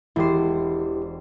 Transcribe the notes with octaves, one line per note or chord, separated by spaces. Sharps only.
E1 E4 G4 C5